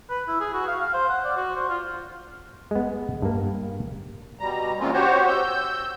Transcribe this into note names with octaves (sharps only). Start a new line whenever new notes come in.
B4
E4
G#4
F#4
F5
F5
C5
F#5
D5
F#4
C5
F4
G#3 B3
G2 A#3
B2 G3 A#5
E3 G#3 A#3 C4 C#4 F4
F#4 G4 C5 C#5
E6 G6